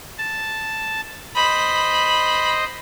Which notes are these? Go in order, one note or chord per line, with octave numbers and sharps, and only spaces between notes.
A5
C5 D#5 B5